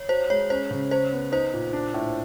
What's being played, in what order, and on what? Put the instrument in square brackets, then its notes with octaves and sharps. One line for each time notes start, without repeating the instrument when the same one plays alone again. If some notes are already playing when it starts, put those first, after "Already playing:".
Already playing: [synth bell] C#5
[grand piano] F#4 [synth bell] C5
[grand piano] G#3 [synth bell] C#5
[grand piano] C#4 [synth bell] C5
[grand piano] C#3
[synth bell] C5 [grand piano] C#5
[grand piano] B3
[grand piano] D#4 [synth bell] C5
[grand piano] A#2
D4
A2